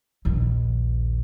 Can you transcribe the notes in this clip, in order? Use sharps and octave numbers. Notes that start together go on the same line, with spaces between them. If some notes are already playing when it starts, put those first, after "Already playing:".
A#1 D#2